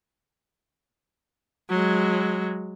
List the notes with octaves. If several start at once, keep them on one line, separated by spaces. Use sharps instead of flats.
F#3 G#3